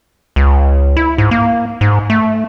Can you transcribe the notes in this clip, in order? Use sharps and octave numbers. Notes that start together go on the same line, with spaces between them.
C#2
E4
G#2
A#3
G#2
A3